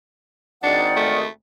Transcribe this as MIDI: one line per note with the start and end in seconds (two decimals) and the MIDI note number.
0.64 1.23 32
0.64 1.23 51
0.64 0.88 62
0.64 1.17 74
0.64 1.17 78
0.96 1.28 57